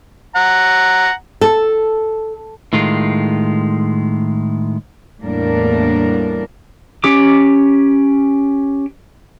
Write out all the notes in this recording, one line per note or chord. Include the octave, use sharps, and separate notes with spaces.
F#5 A#5
A4
A2 D#3 G#3 F4
E2 A2 G3 A#3 D4 A#4
C#4 G4 D6